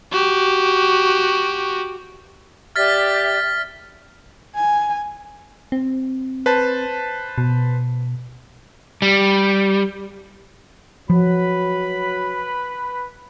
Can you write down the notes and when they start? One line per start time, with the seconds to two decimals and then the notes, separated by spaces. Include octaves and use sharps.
0.12 F#4 G4
2.76 G4 D5 E5 F6 A6 B6
4.56 G#5
5.72 C4
6.46 B4 C5 A5
7.38 B2
9.02 G3
11.10 F3 F#3 B4 B5